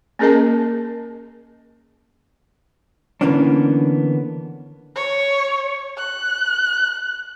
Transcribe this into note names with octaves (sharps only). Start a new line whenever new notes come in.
A#3 C#4 G#4 A#4 D#5 A5
D3 E3 A#3 B3 C#4 D4
C#5
F#6